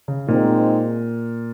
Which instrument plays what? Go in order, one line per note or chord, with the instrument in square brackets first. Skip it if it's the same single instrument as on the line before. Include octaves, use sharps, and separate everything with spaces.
[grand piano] C#3
[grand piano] A#2 [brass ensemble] G#3 C4 D#4